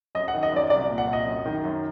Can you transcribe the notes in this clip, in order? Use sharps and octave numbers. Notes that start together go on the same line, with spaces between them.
F#2 D#5
F#5
D#3
D#5
F#2 D5
C2 D5
A#2
F#5
C2
D#5
F#2
D#3
F#2